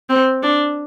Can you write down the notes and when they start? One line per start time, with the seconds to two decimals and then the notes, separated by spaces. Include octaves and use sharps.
0.10 C4
0.43 D4